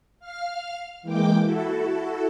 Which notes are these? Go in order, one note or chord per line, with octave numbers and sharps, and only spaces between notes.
F5 F6
E3 G#3 A#3 G5 D6
E4 F#4 A4